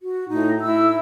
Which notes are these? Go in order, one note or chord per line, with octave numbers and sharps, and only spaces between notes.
F#4
A2 D#4
E4 E6